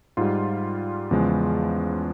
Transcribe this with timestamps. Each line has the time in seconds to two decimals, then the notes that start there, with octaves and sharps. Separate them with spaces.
0.17 G#2 G3 F4
1.11 E2 C#3 F3 G#3